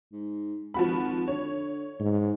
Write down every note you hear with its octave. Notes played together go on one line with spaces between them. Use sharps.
G#2
G#1 F3 F#4 B5
D3 C#5
G#2